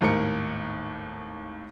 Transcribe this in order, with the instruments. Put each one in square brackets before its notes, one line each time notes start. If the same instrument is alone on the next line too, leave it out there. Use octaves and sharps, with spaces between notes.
[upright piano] G#1 D#2 A2 A#4 C#7